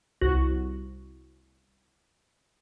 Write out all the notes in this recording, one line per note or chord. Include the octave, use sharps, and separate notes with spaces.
C2 F#4